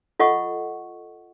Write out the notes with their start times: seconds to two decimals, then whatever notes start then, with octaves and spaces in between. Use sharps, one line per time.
0.20 F4 A4 D#5 F#5 C#6